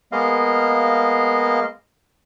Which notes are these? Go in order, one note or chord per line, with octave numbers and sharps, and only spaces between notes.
G#3 A#3 B3 D#5 F5